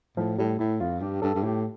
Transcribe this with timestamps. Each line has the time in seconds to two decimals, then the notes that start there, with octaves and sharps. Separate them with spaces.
0.17 A2 F3
0.38 A2 G3
0.59 A2 E4
0.80 F2 F4
1.01 G2 G4
1.22 G2 A4
1.35 G2
1.43 A2 G4